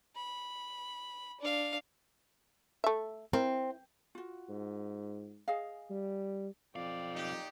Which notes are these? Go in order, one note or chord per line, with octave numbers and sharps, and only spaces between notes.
B5
D4 F5
A3 E5
C4 E4 A#4
F4 F#4
G#2
G#4 D#5 F5
G3
B1 F2 D5 F5 G5
A#2 D#4 G4